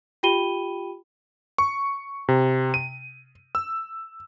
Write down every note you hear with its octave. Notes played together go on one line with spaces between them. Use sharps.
F4 G4 G5 B5 D#7 G7
C#6
C3
D#7
E6